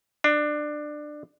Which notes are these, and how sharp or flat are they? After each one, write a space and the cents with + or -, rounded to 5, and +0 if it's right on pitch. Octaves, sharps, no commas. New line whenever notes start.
D4 +20